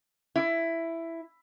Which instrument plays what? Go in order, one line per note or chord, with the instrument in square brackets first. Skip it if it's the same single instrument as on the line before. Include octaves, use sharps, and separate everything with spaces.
[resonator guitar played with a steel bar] E4